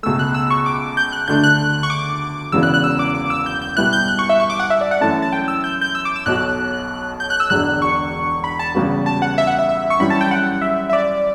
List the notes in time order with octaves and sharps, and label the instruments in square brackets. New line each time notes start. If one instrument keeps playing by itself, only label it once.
[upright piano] C#2 B2 A3 [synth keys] E6
[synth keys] F#6
E6
C#6
D6
G6
F#6
[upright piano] D2 D3 A3 D4 [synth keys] G6
[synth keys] F#6
C#6
D6
[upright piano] E1 E2 C#3 E3 B3 [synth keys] E6
[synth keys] F#6
F#6
E6
D6
D6
D6
E6
G6
G6
[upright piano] B2 G3 B3 E4 [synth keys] F#6
[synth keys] G6
F#6
C#6
E5
C#6
D6
F#5
E5
D5
F#5
[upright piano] F#2 E3 A3 [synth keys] A5
[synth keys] A5
G5
E6
G6
G6
E6
D6
E6
[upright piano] B1 B2 F#3 [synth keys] F#6
[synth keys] G6
F#6
E6
[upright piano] E1 E2 D3 [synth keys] F#6
[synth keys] C#6
B5
A5
[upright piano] E2 C#3 G3 B3 F#4
[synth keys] A5
F#5
E5
F#5
E5
E5
C#6
[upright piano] F#2 E3 G3 [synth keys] B5
[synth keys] A5
G5
F#5
E5
E5
D5